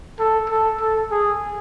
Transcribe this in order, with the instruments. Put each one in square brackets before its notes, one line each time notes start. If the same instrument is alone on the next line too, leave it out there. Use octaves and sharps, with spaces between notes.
[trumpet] A4
A4
A4
G#4